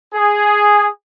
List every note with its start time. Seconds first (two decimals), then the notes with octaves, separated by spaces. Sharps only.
0.14 G#4